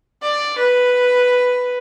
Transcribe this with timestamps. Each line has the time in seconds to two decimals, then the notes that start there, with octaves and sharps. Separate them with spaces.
0.22 D5
0.58 B4